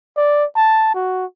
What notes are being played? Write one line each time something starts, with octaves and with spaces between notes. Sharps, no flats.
D5
A5
F#4